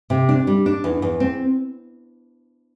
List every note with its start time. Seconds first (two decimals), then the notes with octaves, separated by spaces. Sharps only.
0.10 C3
0.29 D4
0.47 G3
0.66 D4
0.84 E2
1.02 E2
1.20 C4